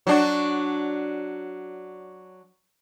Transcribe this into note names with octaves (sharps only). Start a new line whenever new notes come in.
F#3 D4 F#4